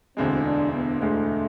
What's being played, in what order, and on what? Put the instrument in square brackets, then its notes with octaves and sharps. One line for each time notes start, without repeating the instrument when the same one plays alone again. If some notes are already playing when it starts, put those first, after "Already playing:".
[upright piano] E1 D2 D3 G#3 [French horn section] C4
[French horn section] D4
B3
[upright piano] E1 D2 D3 G#3 [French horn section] A3